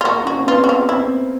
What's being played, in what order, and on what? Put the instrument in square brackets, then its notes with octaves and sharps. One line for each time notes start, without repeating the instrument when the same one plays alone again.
[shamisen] F4
[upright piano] A#3 [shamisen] F#4
[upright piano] C#4 [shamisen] F#4
[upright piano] C4
[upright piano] B3 [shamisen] F4
[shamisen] F#4
F4
[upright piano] C4 [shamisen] E4